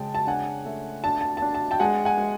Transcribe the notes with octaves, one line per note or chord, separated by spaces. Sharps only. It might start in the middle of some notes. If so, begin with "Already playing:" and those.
Already playing: C#3 G#3 G5 A5
A5
D4 F#5 G#5
A3
D4 A5
A5
A5
D4
A5
G5 A5
G#3 F#5 G#5
F#5 G#5
G#3